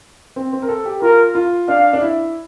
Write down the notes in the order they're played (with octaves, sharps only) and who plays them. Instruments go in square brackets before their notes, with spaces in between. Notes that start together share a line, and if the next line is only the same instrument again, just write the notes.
[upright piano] C4
C4
A#4
A4
G4
[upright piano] F4 [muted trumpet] A#4
[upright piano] F4
[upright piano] D4 [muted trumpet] F5
[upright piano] D4
E4